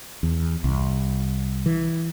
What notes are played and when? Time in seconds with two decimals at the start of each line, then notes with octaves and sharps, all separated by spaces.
0.23 E2
0.64 C2
1.66 E3